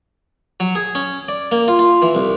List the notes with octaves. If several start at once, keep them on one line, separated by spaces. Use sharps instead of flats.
F#3
G#4
C#4
D5
A#3
F4
F4
E3
C2